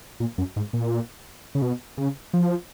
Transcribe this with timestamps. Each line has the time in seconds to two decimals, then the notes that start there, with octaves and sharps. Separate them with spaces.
0.20 A#2
0.38 F#2
0.56 G#2
0.73 A#2
1.55 C#3
1.62 B2
1.97 C#3
2.33 F3